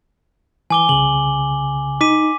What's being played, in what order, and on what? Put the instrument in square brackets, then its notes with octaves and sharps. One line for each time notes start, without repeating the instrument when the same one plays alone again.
[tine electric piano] E3 [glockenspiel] G#5 D6 G7
[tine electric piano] C2 C#3 [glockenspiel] F#7
[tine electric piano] D#4 [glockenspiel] D6 B6 D#7